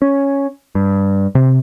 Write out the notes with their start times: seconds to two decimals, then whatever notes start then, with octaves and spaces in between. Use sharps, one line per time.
0.02 C#4
0.75 G2
1.35 C3